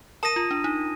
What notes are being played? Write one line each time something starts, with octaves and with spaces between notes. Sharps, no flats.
A#4 A5 D#6 A#6 D#7
F4
D4
D#4